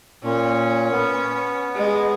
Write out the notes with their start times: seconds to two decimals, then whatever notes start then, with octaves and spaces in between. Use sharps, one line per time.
0.24 A#2 C#4
0.92 B3
1.75 G#3